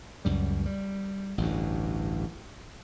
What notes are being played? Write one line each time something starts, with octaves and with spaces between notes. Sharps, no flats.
C#2 F#2 G3
G3
A1 D2 G2